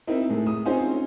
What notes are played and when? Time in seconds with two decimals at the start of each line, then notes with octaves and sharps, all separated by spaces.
0.07 C4 D#4 E4 A#4
0.29 A2 G#3 A3
0.47 D#6
0.65 C4 C#4 D#4 F4 G#4 C5